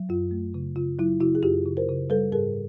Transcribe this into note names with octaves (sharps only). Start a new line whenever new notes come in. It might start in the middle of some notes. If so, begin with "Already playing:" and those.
Already playing: F#3
F#2 F4
A3
C#3
C#3 F4
F#3 E4
C#3 E4 F#4
G#4
F#2 F4 G4
C#3
A#4 C5
C#3
G3 A4 B4
G#2 G#4 A#4